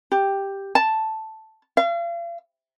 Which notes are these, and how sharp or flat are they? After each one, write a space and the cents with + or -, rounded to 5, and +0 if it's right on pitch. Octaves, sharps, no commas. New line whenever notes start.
G4 +5
A5 +0
F5 -40